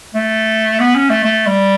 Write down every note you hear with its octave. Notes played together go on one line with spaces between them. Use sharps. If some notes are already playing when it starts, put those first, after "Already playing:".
A3
B3
C#4
A3
A3
G3